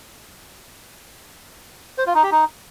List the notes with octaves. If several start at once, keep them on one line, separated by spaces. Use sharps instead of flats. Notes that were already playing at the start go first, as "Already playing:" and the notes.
C5
F4
D#4
G4
D#4